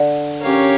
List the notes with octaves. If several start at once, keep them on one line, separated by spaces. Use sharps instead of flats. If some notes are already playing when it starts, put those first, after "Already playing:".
Already playing: D3
C#4 G4 A#4 C#5 F5